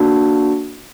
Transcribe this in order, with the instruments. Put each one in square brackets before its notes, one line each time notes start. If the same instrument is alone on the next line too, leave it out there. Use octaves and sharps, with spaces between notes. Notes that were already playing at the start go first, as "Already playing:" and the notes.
Already playing: [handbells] A#3 D4 F#4